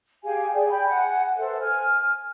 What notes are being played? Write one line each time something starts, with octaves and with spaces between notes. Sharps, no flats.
G4 G#4 F5 G#5
G#4 D5 G5
G5 B5
F#5 G#5
A4 B4 C5 E5
G#5 F6